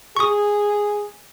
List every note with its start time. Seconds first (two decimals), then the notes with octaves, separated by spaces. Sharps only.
0.17 G#4 C#6 D#6